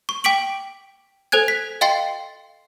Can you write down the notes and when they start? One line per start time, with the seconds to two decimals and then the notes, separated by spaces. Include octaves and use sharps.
0.09 C#6
0.24 G5 D6 B6 D7 F#7
1.32 A4 C5 G#5 F#6 G#6
1.48 B6
1.81 D#5 F5 G5 C6 A6 C7